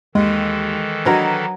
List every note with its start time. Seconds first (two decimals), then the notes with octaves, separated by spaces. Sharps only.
0.15 D#2 D#3 E3 G#3 A4
1.05 F#3 D4 A#4 B4 C#5 D#5